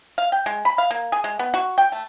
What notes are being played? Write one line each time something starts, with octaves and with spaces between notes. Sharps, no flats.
F5
G5
G#3
B5
F5
A#3
G#4
G#3
B3
F#4
G5
A3